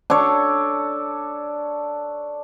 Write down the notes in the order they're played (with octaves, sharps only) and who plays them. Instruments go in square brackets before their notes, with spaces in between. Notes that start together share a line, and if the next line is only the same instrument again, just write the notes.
[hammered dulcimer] D4 A4 C#5